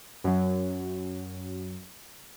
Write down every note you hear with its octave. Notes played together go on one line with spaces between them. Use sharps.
F#2 F#3